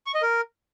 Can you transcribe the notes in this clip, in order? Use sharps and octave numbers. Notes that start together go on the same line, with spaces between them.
C#6
D#5
A#4